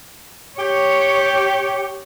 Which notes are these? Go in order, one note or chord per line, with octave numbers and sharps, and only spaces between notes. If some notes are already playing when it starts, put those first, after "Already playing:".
G4 C#5